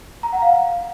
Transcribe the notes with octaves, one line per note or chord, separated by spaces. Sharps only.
A#5
F#5
F5